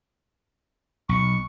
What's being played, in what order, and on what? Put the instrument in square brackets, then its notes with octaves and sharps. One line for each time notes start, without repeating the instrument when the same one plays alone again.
[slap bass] B1 [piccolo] C#6